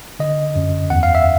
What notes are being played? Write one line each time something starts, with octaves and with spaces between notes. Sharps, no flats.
D3 D#5
F#2
E2 F#5
F5
E5